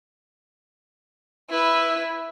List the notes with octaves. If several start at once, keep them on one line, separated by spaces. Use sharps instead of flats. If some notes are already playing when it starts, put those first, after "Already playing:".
E4 B4